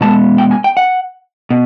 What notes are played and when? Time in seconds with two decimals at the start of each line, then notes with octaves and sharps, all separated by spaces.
0.01 B2 G#3 B3 A5
0.38 G5
0.51 G#5
0.64 G5
0.77 F#5
1.50 B2